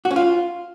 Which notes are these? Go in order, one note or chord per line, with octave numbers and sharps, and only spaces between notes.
F#4
C#4
F4